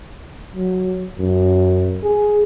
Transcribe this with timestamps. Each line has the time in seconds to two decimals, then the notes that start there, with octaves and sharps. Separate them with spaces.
0.55 F#3
1.18 F#2
2.04 G#4